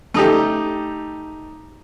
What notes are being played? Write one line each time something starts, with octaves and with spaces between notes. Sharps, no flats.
A3 D#4 G4